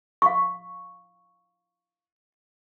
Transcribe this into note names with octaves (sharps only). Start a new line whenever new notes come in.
F5 C#6